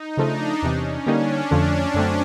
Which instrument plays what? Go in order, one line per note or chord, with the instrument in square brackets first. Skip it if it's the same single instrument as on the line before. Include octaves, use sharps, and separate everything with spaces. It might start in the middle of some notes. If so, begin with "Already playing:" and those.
Already playing: [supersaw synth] D#4
[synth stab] C#3 F3 A3 [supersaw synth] D4
[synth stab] E2 C3 E3 [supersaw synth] C#4
[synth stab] D3 G3 A#3 D#4 [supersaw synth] D4
[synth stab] F2 D3 F3 A3
F#2 D3 F#3 A3 C4